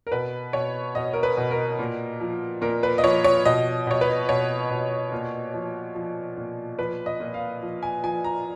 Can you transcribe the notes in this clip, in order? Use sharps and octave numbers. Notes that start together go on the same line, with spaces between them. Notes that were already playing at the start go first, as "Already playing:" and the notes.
A#4
B2 B4
B2 C#5
B2 D#5
A#4
B4
B2
A#4
A#2
F3
A#2 A#4
B4
D#5
F3 C#5
C#5
B2 D#5
B2 C#5
B4
B2 C#5
B2
A#2
F3
F3
A#2
F3 B4
D#5
A#2
F5
F3
G#5
F3 G#5
A#5